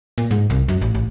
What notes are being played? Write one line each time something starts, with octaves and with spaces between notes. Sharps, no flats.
A#2
G#2
C2
F#2
A1
A1